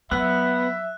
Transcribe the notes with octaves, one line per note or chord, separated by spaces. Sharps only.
F#3 B3 E5 F#6